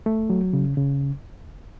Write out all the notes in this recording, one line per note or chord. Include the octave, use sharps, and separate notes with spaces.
A3
F#3
C#3
C#3